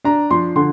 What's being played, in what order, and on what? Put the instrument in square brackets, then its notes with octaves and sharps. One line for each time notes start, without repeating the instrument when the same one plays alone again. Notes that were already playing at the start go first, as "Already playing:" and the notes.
[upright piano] D4 A#5
F3 C6
D3 C6